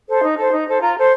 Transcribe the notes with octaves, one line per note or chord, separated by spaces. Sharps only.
A4 C5
D#4
A4 C5
D#4
A4 C5
F4 A#5
A4 C5